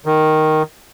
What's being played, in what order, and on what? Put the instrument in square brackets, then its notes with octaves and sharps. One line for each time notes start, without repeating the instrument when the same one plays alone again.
[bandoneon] D#3